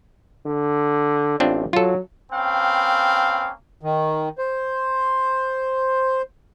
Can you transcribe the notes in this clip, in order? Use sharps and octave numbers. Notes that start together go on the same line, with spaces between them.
D3
A1 C4 D4 F4
F#3 F4 A4
A#3 C4 C#4 B4 F5 G5
D#3
C5